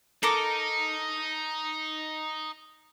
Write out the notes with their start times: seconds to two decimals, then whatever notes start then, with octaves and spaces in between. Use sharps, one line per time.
0.23 D#4 A4 A#4 D6